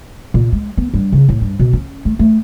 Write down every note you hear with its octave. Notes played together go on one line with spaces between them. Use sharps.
A#2
G#3
B3
G2
C#3
A2
G2
B2
C#4
A3
A3